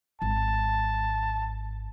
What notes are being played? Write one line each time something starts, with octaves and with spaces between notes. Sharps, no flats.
G#1 A5